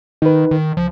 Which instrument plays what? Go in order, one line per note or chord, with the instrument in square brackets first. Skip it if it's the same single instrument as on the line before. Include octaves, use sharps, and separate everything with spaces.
[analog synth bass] D#3 [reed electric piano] D#4 B4
[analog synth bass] D#3
[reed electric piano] C#2 [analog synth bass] F3